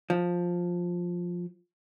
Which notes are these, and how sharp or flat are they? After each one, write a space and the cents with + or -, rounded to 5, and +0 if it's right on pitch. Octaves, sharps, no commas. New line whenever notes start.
F3 +10